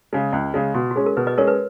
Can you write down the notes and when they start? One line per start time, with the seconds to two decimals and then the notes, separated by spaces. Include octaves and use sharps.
0.13 C#3 G#3
0.33 C#2
0.54 C#3 G#3
0.74 B2 F#4
0.91 F#4
0.96 G#3 C#4 G#4
1.06 A#4
1.17 B2 B4
1.27 B4 D#5
1.38 G#3 C#4 A#4 C#5
1.47 B4